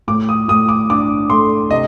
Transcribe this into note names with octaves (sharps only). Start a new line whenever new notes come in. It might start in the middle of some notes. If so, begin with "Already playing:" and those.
A2 D6
D#6
A2 D#6
D6
D4 D6
A3 C6
C3 D#5